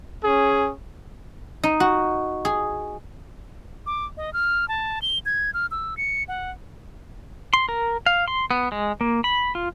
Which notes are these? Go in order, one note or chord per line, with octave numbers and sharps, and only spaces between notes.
C#4 G#4
D#4
F#4
G#4
D6
D#5
F6
A5
G7
G#6
F6
E6
C#7
F#5
C6
A#4
F5
C6
B3
G#3
A#3
B5
F4